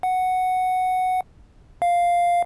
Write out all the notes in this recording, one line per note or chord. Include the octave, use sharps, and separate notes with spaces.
F#5
F5